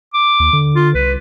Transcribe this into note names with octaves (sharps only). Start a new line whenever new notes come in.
D6
D#2
D3
F4
C2 B4